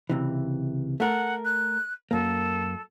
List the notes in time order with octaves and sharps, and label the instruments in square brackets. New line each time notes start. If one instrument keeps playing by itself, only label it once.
[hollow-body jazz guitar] C#2 C3 E3
[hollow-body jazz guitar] A3 A#4 [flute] F#5
[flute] F#6
[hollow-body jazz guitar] F#2 A#3 [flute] A4